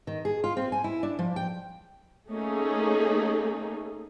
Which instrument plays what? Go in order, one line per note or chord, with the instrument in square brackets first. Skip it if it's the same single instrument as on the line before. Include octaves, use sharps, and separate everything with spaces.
[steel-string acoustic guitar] D#3
G#4
F4
C4
G#5
E4
D4
F3
G5
[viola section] A3 A#3 C#4 D#4 G#4 A4